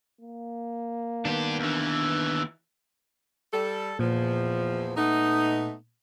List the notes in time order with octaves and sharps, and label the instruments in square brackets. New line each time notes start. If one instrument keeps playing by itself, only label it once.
[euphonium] A#3
[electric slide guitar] D#3 B3 [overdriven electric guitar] D4 G4
[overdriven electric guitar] D#2 E3 [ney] D4
[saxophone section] G3 A4
[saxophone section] E2 F3 [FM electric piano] A#2
[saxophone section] A3 B3 D#4